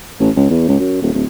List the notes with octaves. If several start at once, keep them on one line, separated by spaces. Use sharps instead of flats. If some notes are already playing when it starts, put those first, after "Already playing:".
A1
C#2
E2
C#2
F#2
D#1
D1